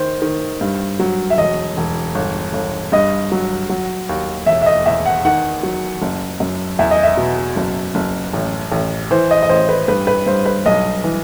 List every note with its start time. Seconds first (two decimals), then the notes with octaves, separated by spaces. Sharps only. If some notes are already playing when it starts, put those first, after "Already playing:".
Already playing: D#3 C5
0.22 D#3
0.61 G2
1.00 F#3
1.30 E5
1.38 E1 D#5
1.77 E1
2.15 G1
2.53 G1
2.92 G2 D#5
3.32 F#3
3.70 F#3
4.09 D#2
4.46 E1 E5
4.62 E5
4.66 D#5
4.86 E2 E5
5.06 F#5
5.25 D#3 F#5
5.63 F#3
6.02 F#1
6.40 F#2
6.79 E2 E5
6.91 D#5
7.03 E5
7.17 B2
7.56 F#1
7.95 F#1
8.33 A1
8.72 A1
9.11 E3 C5
9.31 D#5
9.42 D#5
9.49 A1 C5
9.69 B4
9.88 G2 B4
10.07 B4
10.26 G2 C5
10.46 B4
10.66 B1 D#5
11.04 E3